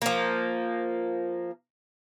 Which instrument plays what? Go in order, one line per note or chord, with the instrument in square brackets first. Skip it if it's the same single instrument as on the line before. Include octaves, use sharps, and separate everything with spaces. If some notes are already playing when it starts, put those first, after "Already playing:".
[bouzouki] F3 A#3